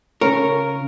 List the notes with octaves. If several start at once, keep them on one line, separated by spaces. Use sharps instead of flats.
C#3 C#4 A#4 C#5